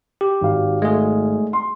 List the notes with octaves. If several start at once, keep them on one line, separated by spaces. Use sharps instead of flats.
G4
G#1 F#4 F5
G#3 A3 G#4
C6